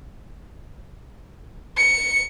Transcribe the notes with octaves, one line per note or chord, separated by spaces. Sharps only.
C#7